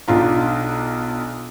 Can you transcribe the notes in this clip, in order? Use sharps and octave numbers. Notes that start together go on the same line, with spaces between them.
B1 D4 F4 A#5